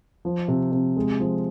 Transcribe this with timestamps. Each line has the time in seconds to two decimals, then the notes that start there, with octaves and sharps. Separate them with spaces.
0.25 F3
0.48 C3
0.72 C3
0.96 G#3
1.20 F3